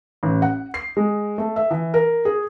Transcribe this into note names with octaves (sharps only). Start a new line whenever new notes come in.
A1
F#5
C7
G#3
A3
E5
E3
A#4
G#4